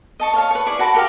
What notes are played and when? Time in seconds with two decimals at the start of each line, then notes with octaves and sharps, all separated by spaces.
0.20 D#5 A5 C#6
0.34 C#5 F5 A5
0.51 B4 C#5
0.66 E4 G#4 D5 C#6
0.79 F#4 A#4 A5 B5
0.94 G4 A#4 E5 F5